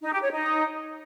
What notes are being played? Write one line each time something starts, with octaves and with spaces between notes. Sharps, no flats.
D#4
G4
C#5
D#4